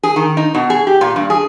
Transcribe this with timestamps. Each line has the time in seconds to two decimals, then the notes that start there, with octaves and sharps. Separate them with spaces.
0.03 G#4
0.16 D#3
0.37 D#4
0.54 B2
0.70 G#4
0.87 G4
1.01 A#2
1.16 G2
1.30 G#4